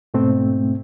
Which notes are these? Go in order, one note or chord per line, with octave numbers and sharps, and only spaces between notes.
G#2 B2 A3 C4